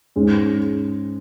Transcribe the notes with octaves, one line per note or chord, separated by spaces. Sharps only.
G#2 G#3 C#4 G#4